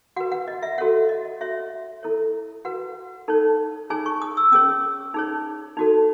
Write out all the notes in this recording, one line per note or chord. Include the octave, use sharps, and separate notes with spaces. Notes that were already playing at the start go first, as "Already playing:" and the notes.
F#4 B4 F#5
F#5
D#5
E5
F#4 A4 C#5 F#5
D#5
F#4 C#5 E5
E4 A4 C#5
F#4 B4 F#5
D#4 A4 C#5
D#4 G#4 C#5 G#5
C#6
D#6
E6
C#4 G#4 C#5 D#6
D#4 G#4 C#5
D#4 F#4 A4